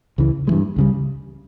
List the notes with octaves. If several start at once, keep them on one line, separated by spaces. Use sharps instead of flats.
C#2 C#3 E3
G2 E3 G#3
C#2 C#3 G3